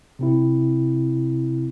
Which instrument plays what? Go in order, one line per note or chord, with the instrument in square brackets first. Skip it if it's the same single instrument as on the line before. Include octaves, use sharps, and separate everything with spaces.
[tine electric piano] C3 C4 E4